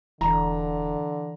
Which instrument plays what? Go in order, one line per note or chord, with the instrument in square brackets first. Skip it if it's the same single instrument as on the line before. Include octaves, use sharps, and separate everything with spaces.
[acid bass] E1 [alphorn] D3 [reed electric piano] E3 [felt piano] A#5